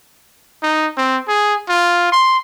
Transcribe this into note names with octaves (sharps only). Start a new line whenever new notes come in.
D#4
C4
G#4
F4
C6